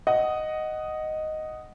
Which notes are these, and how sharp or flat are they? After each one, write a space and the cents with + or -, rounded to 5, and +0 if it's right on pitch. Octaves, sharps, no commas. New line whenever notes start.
D#5 +0 F#5 +10